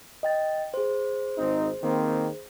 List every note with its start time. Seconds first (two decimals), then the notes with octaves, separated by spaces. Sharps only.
0.23 D#5 G5 A6
0.74 G#4 C5
1.38 G#1 C4 D#4
1.83 D#3 A#3 C4